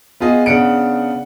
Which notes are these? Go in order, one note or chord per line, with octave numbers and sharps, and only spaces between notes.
B3 F4 G#4 D#5
C#3 B3 D4 F#5 C#7 D7